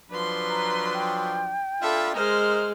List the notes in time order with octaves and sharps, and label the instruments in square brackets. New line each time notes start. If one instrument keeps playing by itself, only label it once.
[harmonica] F3 F#3 D4 [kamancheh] B4 C6
[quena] A#5
G5
[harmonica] D4 F4 [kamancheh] A4 B5 [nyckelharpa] E5
[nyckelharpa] G#3 [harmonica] A#4 D#5 [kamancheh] C5 F6